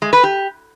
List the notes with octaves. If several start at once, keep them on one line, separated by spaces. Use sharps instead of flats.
G#3
B4
G4